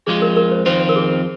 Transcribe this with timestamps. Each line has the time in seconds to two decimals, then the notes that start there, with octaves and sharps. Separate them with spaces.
0.07 F2 F3 G#3 F4 G#4
0.22 A#4
0.36 A#4
0.51 C5
0.66 F2 D#3 C4 F4 C5
0.81 C5
0.89 A#4
0.96 G#4